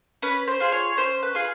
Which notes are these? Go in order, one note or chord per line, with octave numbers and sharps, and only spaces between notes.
C#4 B4
C5
F4 G#4
C#5
C#4 C5
B4
F4 G#4